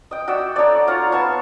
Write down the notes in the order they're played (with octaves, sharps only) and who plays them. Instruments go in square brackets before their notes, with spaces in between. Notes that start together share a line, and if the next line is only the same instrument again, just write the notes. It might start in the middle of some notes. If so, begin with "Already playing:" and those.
[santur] D#5 G5
F#4 D5 E5 G5
D#4 A4 C#5 D5
F4 C#5 F5 A#5
B3 C#5 A5 C#6